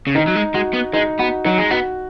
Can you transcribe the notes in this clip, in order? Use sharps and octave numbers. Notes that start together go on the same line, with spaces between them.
C#3
D#3 D#4
F#3
G#3
G#3 F#4
B3
G#3 D#4
B3 F#4
F#3 D#4
G#3
B3 F#4